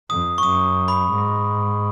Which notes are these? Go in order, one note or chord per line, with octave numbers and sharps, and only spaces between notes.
F2 D#6
C#6
F#2 D#6
B5
G#2